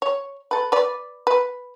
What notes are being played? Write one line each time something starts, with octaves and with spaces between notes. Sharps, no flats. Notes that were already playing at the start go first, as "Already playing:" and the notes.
C#5
A4 B4
B4 D5
B4